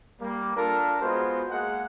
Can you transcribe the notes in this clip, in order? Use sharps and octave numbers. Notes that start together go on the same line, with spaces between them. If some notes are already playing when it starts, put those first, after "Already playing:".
G3 A#3
D4 F4 A4 A#4
G#3 B3 F4 F#4 C5
G#3 A#3 G#4 F#5